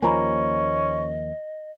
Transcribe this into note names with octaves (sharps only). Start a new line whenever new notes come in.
D#2 F3 A#3 C#4 D#5 G#5 A#5 B5